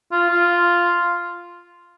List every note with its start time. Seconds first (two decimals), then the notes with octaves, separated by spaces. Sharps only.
0.12 F4
0.30 F4